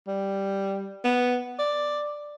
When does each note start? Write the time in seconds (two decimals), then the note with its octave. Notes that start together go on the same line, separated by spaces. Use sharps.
0.07 G3
1.04 B3
1.59 D5